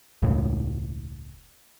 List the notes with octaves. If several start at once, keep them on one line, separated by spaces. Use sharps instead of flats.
E1 C#2 A2